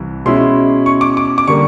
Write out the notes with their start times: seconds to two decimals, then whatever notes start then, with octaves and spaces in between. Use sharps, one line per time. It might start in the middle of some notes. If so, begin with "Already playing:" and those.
Already playing: C2 C3 E3
0.25 B2 G#3 C#4 E4 C6
0.86 C#6
1.01 D6
1.17 D6
1.38 D6
1.47 D3 G3 A#3 C#6